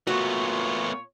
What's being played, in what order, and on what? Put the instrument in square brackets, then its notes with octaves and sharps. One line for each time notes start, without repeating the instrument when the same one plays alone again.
[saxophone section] A#2 F4 C#5 [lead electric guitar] A3 B3 [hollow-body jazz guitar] F#4